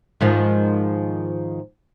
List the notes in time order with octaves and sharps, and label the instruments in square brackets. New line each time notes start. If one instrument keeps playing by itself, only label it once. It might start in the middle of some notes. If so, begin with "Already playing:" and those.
[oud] G#2 D#3 F3